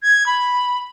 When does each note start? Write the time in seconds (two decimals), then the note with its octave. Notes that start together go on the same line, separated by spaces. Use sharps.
0.03 G#6
0.26 B5